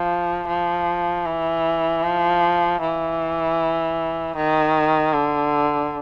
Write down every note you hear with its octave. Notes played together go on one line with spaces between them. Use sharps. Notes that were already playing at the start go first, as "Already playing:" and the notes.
Already playing: F3
F3
E3
F3
E3
D#3
D3